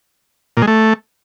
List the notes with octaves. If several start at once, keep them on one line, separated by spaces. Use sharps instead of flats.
A#2
G#3
A3